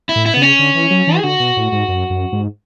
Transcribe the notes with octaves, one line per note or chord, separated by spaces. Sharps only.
E4
A2
E4
C#3 B3
C#4
D3
E3
F#3
E3
G#4
D3 F#4
B2
A2
G#2
F#2
F#2
G#2